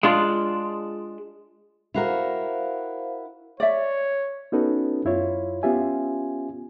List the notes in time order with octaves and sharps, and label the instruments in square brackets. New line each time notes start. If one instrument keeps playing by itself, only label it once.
[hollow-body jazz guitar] G#3 D4 F4
[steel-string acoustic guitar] E4 F#4 A#4 [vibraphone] C5 F5
[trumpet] C#5 [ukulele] D5 E5
[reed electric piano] B3 C#4 D#4 F#4 A4 B4
F#2 E4 F4 C#5
B3 C#4 F4 G4 E5 G#5